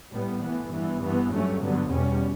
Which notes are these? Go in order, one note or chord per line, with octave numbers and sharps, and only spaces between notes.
A2 G3 B3
A2 E3 B3
G2 E3 B3
G2 E3 B3
G2 F#3 A3 C#4
G2 D3 F#3 B3
E2 B2 G3 C#4